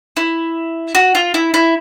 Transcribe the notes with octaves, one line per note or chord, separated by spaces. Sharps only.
E4
F#4
F4
E4
E4